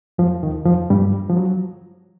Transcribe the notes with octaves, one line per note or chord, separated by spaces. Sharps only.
F2 F3
D#2 D#3
F2 F3
G2 G3
F3
F#3